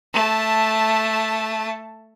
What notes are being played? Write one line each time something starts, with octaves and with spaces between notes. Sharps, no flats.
A3 A5